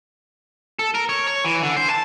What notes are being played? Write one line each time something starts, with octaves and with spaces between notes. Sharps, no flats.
A4
A#4
C#5
C#5
E3
D3
C5
A5